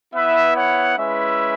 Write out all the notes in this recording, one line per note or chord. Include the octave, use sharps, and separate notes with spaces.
B3 E4 B4 E5
C#5 F#5
G#3 C#4 E4 B4 E5